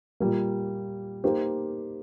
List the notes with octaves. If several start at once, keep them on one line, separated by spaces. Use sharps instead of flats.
A#2 G3 A#3
A#3 D#4 G4 C5